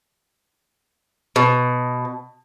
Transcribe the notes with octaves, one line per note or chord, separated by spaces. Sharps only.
B2